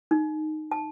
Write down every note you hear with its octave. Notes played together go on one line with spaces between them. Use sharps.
D#4
A5